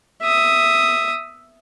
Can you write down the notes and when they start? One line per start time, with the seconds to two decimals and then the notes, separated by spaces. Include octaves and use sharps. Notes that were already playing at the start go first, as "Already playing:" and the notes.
0.22 E5 D#6